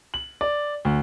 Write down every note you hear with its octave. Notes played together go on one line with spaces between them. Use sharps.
F#7
D5
D2